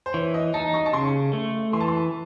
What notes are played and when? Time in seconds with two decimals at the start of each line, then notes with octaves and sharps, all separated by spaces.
0.06 C5
0.14 E3 C#5
0.34 D#5
0.54 D#4 A5
0.74 C#6
0.86 A5
0.93 C#3 C6
1.33 A3
1.73 E3 C6
1.81 A5
1.88 C6